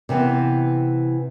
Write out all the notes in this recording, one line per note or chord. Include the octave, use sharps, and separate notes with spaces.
C3 E3 B3 C4